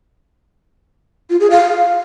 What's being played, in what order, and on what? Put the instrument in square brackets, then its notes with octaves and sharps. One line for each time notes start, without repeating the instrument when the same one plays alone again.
[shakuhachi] F4
G#4
F5